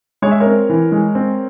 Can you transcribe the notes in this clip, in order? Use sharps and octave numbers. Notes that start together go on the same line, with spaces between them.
G#3 C#5
E5
A#4 C#5
C4
E3
G#3
C4